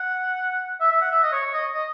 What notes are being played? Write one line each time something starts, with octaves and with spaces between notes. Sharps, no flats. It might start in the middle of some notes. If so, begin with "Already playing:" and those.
Already playing: F#5
E5
E5
F#5
E5
D#5
C#5
C#5
D#5
D#5